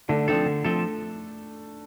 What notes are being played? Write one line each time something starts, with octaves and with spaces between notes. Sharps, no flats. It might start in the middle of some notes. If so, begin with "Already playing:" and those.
D3 A3 D4
F3 A3 C4 D4 A4
D3
F3 A3 C4 A4